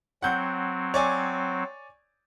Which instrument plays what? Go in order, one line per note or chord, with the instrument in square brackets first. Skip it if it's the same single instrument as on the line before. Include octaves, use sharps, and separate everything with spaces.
[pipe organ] F#3 C4 [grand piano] F#5 G6
[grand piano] C#5 D5 G#5